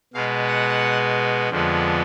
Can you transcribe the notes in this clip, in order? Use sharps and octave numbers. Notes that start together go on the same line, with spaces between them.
B2 G#3 B3 F5
F#5
F2 D3 F3 G#3 B3